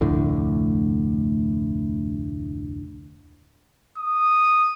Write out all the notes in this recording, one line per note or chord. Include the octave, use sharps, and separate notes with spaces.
F1 D2 A2 D3
D#6